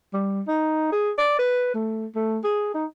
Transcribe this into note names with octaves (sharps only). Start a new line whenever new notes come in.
G3
D#4
G#4
D5
B4
A3
A3
G#4
D#4